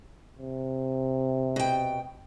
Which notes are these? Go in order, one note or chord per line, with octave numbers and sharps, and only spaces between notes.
C3
B2 G5